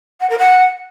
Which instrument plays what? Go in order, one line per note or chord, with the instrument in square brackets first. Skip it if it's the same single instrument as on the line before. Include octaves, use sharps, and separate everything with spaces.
[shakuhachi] F#5
A#4
F#5